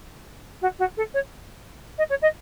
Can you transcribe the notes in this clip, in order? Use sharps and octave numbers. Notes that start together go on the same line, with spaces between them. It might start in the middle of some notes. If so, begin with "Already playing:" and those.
F#4
F#4
A4
C#5
D#5
C#5
D#5